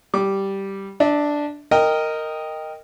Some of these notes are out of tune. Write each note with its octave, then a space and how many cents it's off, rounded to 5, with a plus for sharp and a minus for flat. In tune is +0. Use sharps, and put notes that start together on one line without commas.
G3 -5 D6 +0
D4 +0 E5 -40
A#4 -10 D#5 +0 G5 +5